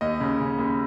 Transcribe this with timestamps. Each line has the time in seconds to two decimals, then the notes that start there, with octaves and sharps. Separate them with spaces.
0.01 D#2 D#5
0.20 C#3
0.39 C#3
0.58 D#2